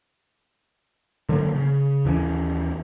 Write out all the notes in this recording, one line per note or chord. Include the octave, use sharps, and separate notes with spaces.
D3 F#3 G#3 A#3
C#3
D#2 E3 C#4